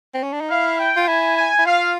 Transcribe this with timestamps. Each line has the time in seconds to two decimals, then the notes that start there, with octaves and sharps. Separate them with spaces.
0.14 C4
0.23 C#4
0.33 D4
0.41 D#4
0.51 E4 F5
0.79 G5
0.97 F4
1.08 E4 G#5
1.37 G#5
1.59 E4
1.66 F4 F5